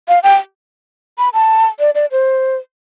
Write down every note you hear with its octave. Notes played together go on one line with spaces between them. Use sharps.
F5
G5
B5
A5
D5
D5
C5